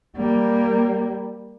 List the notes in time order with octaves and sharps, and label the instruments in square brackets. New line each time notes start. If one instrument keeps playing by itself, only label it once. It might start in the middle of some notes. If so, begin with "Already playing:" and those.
[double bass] G3 A#3